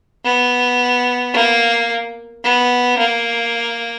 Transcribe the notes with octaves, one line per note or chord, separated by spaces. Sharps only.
B3
A#3
B3
A#3